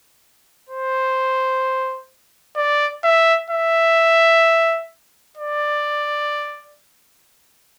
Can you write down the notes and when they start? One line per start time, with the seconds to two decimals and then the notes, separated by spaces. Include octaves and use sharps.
0.69 C5
2.56 D5
3.04 E5
3.50 E5
5.37 D5